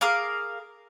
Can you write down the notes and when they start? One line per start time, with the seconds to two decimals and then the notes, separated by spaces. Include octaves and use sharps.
0.01 G#4 A#4 F5 D6